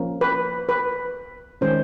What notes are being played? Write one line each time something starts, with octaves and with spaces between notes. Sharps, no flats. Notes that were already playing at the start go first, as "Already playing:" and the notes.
Already playing: F3 A#3 C#4
B4
B4
D#3 G#3 C#4 C5